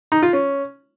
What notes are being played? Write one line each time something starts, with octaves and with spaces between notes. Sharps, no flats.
D#4
F4
C#4